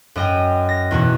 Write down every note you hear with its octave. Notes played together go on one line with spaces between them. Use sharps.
F#2 D#5 G5
A#6
E2 B2 F#4